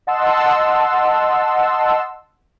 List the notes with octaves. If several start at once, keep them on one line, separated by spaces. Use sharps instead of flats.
D#5 F#5 A5 C6 E6